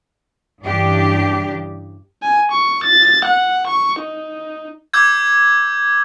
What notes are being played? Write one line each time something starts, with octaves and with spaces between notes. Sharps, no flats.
G2 C#3 E3 D4 G4
G#5
C#6
A6
F#5
C#6
D#4
D6 E6 G6 G#6